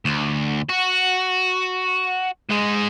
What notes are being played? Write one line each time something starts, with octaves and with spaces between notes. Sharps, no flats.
D2
F#4
G#2 G#3